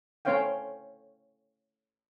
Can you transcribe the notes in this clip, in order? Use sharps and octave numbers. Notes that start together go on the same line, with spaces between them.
A3 C#4 C5 C#5 F5 G5